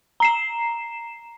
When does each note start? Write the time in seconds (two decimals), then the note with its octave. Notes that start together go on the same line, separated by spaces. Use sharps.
0.20 A#5 C7 E7